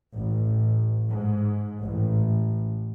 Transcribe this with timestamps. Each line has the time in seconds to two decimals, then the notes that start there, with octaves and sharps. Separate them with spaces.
0.16 A1
1.09 G#2
1.83 A1